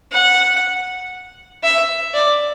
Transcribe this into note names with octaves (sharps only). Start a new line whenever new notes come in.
F#5
E5
D5